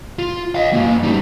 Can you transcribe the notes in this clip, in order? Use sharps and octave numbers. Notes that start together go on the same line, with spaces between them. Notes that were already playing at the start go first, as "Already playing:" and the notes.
F4
D#5 F5
A#3 F#4
G3 D#4